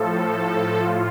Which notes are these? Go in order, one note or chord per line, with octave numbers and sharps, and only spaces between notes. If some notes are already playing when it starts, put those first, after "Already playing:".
Already playing: A2 F3 A4
A2 F3
A2 F4